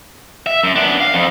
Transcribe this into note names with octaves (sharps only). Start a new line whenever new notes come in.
E5
F#2
B3 D4
F5
F2